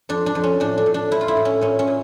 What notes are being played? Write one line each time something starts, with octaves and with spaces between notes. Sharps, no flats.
F2 D4
D4
F2
C#4
A2 D4
D4
A2
D4
A2 E4
F4
E4
A2
C#4
A#2 C#4
C#4
A#2